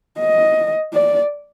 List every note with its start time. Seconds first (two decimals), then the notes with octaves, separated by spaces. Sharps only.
0.20 D#5
0.93 D5